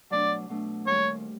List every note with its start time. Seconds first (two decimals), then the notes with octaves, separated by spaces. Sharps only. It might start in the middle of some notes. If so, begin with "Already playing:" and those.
0.10 B2 F#3 A3 D4 D5
0.49 B2 F#3 A3 D4
0.85 D#2 D#3 G3 C4 C#5